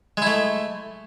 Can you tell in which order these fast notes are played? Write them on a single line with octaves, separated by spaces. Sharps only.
G#3 E4 A3